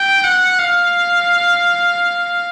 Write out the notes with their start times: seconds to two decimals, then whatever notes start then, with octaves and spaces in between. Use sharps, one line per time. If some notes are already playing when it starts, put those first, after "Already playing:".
Already playing: G5
0.24 F#5
0.59 F5